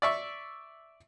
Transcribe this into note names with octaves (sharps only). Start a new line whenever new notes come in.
D5 E5 C#6